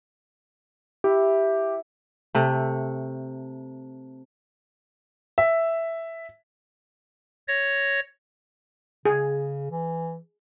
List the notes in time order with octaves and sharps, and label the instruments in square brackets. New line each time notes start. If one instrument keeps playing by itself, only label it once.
[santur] E4 [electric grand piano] G4
[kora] C3 A3
[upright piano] E5
[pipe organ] C#5 A#6
[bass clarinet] C#3 [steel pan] G#4
[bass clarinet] E3